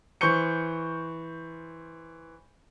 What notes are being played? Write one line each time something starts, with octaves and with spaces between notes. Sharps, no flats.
E3 C5 C#6 G6 C#7